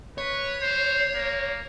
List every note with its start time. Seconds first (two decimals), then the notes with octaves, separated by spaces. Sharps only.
0.18 B4 C#5
0.61 C5
1.14 A#3